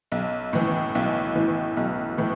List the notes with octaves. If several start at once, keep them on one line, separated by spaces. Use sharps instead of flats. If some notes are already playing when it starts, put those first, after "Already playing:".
B1
A2 E3
B1
A2 E3
B1
A2 E3